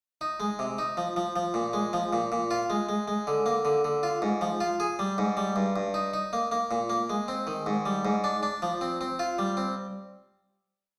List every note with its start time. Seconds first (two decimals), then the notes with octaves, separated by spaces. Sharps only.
0.21 D#4
0.40 G#3
0.59 C3
0.78 D#4
0.97 F3
1.16 F3
1.36 F3
1.54 A#2
1.73 G#3
1.93 F3
2.13 A#2
2.32 A#2
2.51 F4
2.70 G#3
2.89 G#3
3.08 G#3
3.27 D3
3.46 A#3
3.65 D3
3.85 D3
4.03 F4
4.22 G#2
4.41 F3
4.61 F4
4.80 G#4
4.99 G3
5.18 G#2
5.37 G3
5.56 G2
5.76 G2
5.94 D#4
6.14 D#4
6.33 A#3
6.52 A#3
6.71 A#2
6.90 A#3
7.10 G#3
7.28 C4
7.47 D#3
7.66 G#2
7.86 G3
8.05 G#2
8.24 D4
8.43 D4
8.62 F3
8.81 C4
9.01 C4
9.19 F4
9.38 G3
9.57 C4